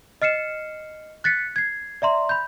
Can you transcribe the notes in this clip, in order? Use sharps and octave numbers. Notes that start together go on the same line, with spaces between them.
D#5 F6 C7 C#7 E7
F#6 A6 B6 C#7
G#6 C7
D5 E5 A#5 C6
B5 G6